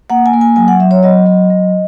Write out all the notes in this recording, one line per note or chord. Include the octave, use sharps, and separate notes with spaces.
A#3 F#5
G#5
A#3
G#5
F#3 G#5
F#5
F#3 E5
C#5
F#3 D#5
F#3
F#3